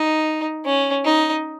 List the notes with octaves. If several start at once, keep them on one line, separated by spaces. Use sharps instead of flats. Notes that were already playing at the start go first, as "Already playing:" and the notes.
Already playing: D#4
C#4
D#4